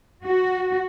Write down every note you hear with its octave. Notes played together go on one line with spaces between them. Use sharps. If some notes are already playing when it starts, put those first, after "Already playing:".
F#4